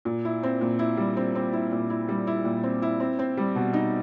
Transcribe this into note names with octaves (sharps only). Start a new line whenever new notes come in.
A#2
E4
C4
A#2
E4
G3
C4
C4
E4
A#2
E4
G3
E4
A#2
C4
E4
C4
C4
G3
B2
D#4